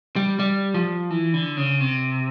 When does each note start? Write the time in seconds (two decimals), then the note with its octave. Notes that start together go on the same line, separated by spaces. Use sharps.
0.16 G3
0.40 G3
0.74 F3
1.10 E3
1.34 D3
1.57 C#3
1.80 C3